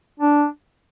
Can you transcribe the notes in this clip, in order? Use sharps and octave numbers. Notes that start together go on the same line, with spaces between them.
D4